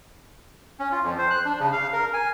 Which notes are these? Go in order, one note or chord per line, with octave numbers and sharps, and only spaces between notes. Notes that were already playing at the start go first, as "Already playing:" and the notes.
C#4
F4
F2
C5
F#6
D4
C#3
F5
A#4
G#5